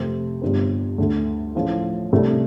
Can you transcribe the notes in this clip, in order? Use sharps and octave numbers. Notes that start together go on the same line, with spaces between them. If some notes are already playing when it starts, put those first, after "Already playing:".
Already playing: F2 C3 A3 C4
G1 G2 G3 C4
D2 D3 A3
A1 A2 F3 A3
C2 C3 A3 D4